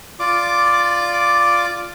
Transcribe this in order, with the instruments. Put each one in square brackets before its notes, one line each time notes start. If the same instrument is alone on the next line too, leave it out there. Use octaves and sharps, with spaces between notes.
[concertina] F4 D5 D6